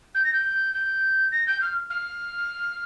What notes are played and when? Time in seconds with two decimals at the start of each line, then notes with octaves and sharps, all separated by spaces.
0.15 G6
0.24 A#6
0.33 G6
0.74 G6
1.32 A#6
1.47 G6
1.62 F6
1.90 F6